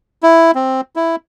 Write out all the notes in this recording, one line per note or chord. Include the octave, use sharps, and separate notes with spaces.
E4
C4
E4